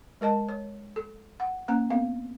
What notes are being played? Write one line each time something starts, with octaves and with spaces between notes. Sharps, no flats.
G#3 A#4 D#5 A5
C#5
A4
F#5
A#3 C#4 A#5
B3 C4 F5